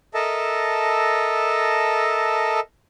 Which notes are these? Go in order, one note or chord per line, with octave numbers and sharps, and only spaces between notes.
A4 A#4 D#5 E5 A5